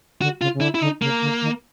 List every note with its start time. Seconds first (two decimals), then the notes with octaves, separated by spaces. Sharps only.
0.21 D3 F#4
0.41 C#3 F4
0.54 C#3
0.61 D3 E4
0.75 E4
0.81 D3 D#4
1.02 C#3 A#3
1.22 D3
1.42 D#3